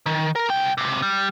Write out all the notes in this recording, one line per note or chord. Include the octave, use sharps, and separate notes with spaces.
D#3
A#4
C2 G5
C#2 C3
G3